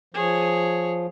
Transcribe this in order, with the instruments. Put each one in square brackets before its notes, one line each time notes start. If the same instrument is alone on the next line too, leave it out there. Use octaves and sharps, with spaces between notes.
[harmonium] F3 [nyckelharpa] G#4 C#5